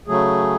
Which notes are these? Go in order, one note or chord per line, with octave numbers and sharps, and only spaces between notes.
C#3 F#3 A3 G#4